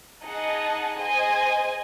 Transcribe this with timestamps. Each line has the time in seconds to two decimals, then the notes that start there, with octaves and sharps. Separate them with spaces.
0.22 D#4 G#4 D#5 F#5 A5
0.98 G#4 C5 D#5 G#5